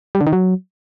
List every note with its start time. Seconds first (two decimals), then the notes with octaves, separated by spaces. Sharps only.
0.15 G3
0.21 D3
0.27 D#3
0.33 F#3